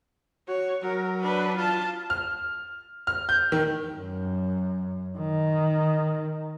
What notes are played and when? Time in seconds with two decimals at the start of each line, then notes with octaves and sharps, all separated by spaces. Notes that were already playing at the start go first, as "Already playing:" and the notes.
0.48 F#4 C#5
0.83 F#3 A#4
1.22 D4 B4
1.57 F4 A5
2.10 F6
3.07 F6
3.29 G6
3.52 D#3
3.96 F#2
5.18 D#3